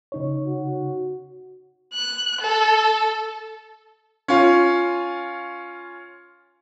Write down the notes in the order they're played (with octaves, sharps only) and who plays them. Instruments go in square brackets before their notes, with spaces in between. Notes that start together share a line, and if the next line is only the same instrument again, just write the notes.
[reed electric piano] C#3 D#4 C#5
[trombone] F#4
[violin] F#6
A4
[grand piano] C#4 F4